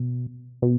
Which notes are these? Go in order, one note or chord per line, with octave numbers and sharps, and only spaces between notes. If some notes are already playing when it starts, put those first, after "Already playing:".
Already playing: B2
B2